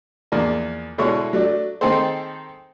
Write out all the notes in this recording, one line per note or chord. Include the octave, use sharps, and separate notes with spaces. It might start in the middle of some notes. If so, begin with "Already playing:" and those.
E2 F3 A#3 D4
B2 D3 G#3 E4 G#4 C#5
F#3 A3 D4
D#3 C4 D#4 G#4 A4 C5